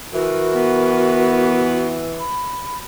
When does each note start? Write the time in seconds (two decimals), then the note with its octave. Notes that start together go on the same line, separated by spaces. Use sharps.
0.13 E3 F#4 A#4
0.54 B3
2.19 B5